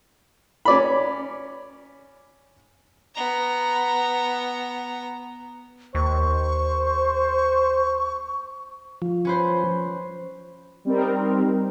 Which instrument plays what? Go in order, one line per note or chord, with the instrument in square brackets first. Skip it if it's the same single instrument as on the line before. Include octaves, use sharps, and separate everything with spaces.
[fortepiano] C#4 D5 B5
[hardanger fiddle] B3 A#5
[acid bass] D#2 [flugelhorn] C5 [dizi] C#6
[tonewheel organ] F3
[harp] C#4 B4 C5
[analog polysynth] G3 C4 D#4 A#4